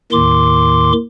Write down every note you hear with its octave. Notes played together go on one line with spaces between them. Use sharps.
D#2 A2 D#3 C6 D6